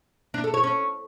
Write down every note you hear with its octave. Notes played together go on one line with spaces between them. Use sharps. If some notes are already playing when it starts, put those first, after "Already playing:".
D4
A4
C#5
C#4